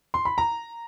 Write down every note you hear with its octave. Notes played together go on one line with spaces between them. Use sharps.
C6
B5
A#5